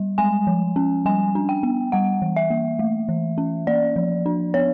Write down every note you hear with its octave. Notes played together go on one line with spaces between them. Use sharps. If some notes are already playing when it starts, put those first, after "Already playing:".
Already playing: G3
G#3 G#5
F3
C#4
G3 G#5
D4
G5
B3
G3 F#5
E3
E5
A#3
A3
E3
C#4
A#3 D5
F3
D4
B3 C#5